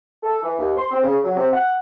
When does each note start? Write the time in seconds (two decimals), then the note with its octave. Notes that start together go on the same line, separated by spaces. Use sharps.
0.23 A4
0.43 E3
0.59 D#2
0.77 C6
0.91 C4
1.03 C#3
1.24 F#3
1.37 C3
1.53 F#5